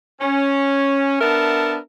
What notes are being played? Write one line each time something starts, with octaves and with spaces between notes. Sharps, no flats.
C#4
B3 D4 A#4 E5 F#5 A5